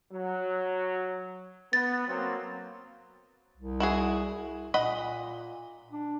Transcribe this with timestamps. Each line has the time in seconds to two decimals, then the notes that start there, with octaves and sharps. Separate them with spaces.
0.13 F#3
1.73 B3 A6
2.08 F#3 A#3 C4
3.57 C2
3.80 E4 F#4 G#4
4.74 A#2 D#5 F#5 B5
5.92 D4